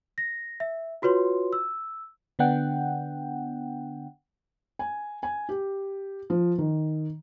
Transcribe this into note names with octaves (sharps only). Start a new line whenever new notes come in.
A#6
E5
F4 F#4 B4 C#5 C6
E6
D3 B3 D4 F#5 G5
G#5
G#5
G4
F3
D#3